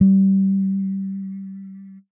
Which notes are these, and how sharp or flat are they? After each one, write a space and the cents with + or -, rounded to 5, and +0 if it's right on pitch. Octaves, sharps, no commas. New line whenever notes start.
G3 -20